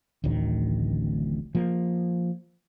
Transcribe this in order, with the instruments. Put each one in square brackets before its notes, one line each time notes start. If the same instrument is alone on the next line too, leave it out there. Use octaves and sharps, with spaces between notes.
[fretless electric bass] D1 A1 D2 D#3
F3 A#3